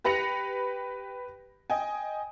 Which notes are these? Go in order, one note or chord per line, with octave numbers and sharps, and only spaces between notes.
G4 B4 B5 A#6 C#7 F7
D#5 G5 G#5